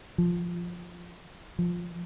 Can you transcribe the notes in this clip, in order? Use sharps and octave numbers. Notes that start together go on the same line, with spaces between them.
F3
F3